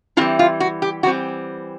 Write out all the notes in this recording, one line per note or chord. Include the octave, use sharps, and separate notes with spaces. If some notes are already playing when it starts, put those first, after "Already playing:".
E3 G3 C4 E4 F4
F4
F#4
G4
E3 G3 C4 F#4